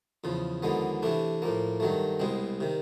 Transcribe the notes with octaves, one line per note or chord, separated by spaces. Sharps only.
E2 C#3 F3
D#2 D3 F3 G#3 B3
C3 E3 A3 D4
A2 F3 A#3
G2 D#3 F#3 A3
C2 B2 G#3 C4
C3 D#3